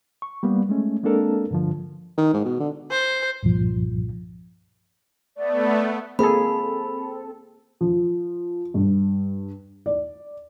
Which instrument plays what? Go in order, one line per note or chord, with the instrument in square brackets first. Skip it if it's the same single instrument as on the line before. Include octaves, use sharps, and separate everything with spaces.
[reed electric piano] C#6
G3 A#3 B3
G#3 A3 C#4
G#3 A#3 C4 D4 A4 A#4
G2 D3 F3
[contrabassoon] D#3
G#2
B2
D3
[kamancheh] C5
[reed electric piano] C2 G2 A#2 F3
[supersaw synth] A3 B3 [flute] D5
[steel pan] A#3 G#4 [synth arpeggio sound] C4 A4 [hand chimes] B5
[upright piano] F3
G2
D5